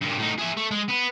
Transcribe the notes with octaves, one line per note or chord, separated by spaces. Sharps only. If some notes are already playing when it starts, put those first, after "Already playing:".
G2 A#2
A2 D#4
G#4 E5
A3
G#3
B3 B4